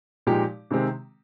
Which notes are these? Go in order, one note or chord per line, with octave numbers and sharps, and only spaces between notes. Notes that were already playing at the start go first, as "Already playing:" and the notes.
A#2 F3 G#3 D#4 G4
C3 D#3 G#3 C4 G4